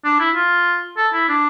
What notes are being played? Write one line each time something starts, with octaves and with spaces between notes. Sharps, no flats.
D4
E4
F4
A4
E4
D4